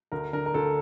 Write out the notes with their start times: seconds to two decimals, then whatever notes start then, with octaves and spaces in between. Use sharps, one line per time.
0.12 D2 A#4
0.33 D3 A#4
0.46 A#4
0.54 D2 A4